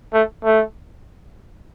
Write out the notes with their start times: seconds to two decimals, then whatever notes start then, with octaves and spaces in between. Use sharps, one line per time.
0.14 A3
0.45 A3